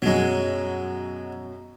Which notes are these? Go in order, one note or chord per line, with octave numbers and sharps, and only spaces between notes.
F#2 B2 F#3 G#3